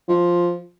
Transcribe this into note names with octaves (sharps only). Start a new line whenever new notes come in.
F3